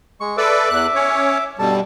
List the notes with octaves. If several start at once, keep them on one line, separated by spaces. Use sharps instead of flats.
G#3 C#6
A4 B4 D5 E5 D6
E2 F#6
C#4 C#5
G2 B2 G3 A4 A5